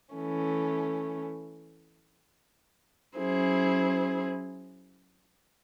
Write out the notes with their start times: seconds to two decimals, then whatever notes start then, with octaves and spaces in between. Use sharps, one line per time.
0.13 E3 A3 C#4
3.16 F#3 C#4 E4 G#4 C5